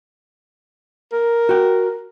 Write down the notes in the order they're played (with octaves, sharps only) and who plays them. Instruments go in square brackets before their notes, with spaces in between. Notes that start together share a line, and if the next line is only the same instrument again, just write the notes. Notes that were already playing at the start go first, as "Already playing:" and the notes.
[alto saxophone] A#4
[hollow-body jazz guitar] F#4 G5